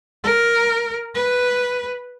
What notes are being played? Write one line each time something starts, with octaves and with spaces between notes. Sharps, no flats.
A#4
B4